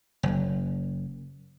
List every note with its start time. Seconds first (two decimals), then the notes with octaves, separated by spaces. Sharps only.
0.23 F#1